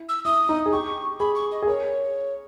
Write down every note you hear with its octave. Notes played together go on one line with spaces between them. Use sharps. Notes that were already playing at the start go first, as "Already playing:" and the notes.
Already playing: E4
E6
E4 D#6
D#4
G#4
G4 C#6
G#4 B5
C#6
D#5
G#4
A#4 C#5